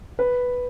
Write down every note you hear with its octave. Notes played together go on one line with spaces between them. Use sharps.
B4